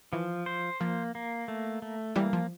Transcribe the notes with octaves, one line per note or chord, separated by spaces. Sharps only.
E3 F3
C5
F3 A#3
A#3
A3
A3
E3 G3 A#3
F3